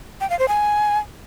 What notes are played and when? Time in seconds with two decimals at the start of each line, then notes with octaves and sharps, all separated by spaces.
0.21 G5
0.30 F5
0.39 C5
0.48 G#5